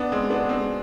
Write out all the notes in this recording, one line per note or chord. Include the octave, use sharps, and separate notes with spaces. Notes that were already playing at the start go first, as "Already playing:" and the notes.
Already playing: B3 D4
G#3 C4
B3 D4
G#3 C4